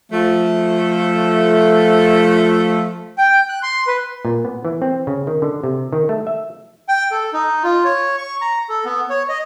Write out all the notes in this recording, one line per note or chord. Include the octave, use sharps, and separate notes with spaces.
F3 A3
G5
F#6
C6
B4
A#2
B3
E3
C4
C#3
D#3
D3
C3
D#3
A3
E5
G5
A4
D#4
F4
C#5
C#6
A#5
A4
B3
C#5
D#5